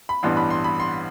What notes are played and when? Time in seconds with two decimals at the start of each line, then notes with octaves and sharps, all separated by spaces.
0.09 B5
0.23 A1 G2 E3 B3 D4 C6
0.37 B5
0.50 C6
0.64 B5
0.80 C6